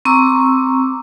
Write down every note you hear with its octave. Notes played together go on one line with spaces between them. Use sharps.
C4 A#5 C#6 D6 E6